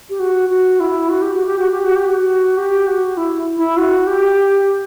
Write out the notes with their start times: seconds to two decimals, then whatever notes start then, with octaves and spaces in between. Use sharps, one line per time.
0.10 G4
0.20 F#4
0.50 F#4
0.80 E4
1.09 F#4
1.22 G4
1.35 F#4
1.46 G4
1.59 F#4
1.71 G4
1.84 F#4
1.96 G4
2.08 F#4
2.58 G4
2.87 F#4
3.17 E4
3.57 E4
3.77 F#4
4.07 G4